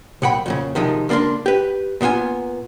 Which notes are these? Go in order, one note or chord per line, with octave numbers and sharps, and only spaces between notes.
B1 A#2 F#5 G5 B5
F2 A#2 C#3
C3 D#3 F3 G#3
C#2 A#3 D4 A#4 C6
G4 B4
A#2 D#3 B3 F4 G#5